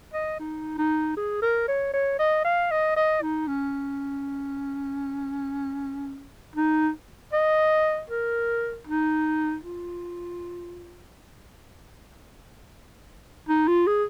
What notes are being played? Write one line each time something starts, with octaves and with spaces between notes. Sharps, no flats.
D#5
D#4
D#4
G#4
A#4
C#5
C#5
D#5
F5
D#5
D#5
D#4
C#4
D#4
D#5
A#4
D#4
F4
D#4
F4
G#4